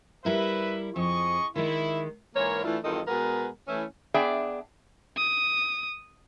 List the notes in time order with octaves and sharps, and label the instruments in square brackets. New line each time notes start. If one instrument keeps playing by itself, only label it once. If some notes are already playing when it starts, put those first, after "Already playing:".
[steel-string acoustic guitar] G3 E4 A#4 [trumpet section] B4 E5
[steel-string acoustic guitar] F2 [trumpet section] G#4 D#5 C#6
[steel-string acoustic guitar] D#3 G#3 [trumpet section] E4
[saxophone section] G#2 E3 A#3 A#4 C#5
E3 A3 D4 E4 F4
E2 G2 D#3 F4 A4 D#5
B2 G#3 B3 A#4 B4
E3 A3 C#4 E4
[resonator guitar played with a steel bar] B3 D4 G#4 D5 E5 G5
[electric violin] D#6